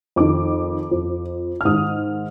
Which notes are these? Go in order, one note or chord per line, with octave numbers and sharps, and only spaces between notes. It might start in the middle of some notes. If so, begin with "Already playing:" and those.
F2 D#3 D6
F2 F3
F6
G#2 D#3 D#6